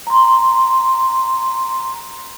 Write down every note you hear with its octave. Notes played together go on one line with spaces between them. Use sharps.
A#5 C6